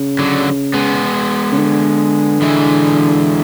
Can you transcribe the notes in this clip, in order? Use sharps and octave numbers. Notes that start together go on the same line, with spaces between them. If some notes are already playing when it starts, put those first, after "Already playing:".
Already playing: C#3
D3 F#3
G#3 B3
C#3
D3
E3 G#3